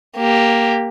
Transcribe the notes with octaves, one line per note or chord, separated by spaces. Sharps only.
A#3 G4